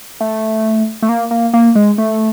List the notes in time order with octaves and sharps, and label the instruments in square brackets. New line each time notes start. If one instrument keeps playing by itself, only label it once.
[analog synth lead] A3
A3
A#3
A#3
A#3
G#3
A3